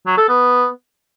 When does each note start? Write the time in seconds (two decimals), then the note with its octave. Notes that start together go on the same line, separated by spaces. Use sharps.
0.07 F#3
0.18 A4
0.29 B3